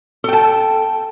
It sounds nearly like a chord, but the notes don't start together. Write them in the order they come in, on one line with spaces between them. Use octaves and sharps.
A4 G5 A5